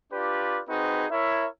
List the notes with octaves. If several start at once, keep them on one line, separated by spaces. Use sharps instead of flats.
D4 F4 G4 B4 D5
C4 D#4 F#4 G#4 B4
E4 A#4 C#5 E5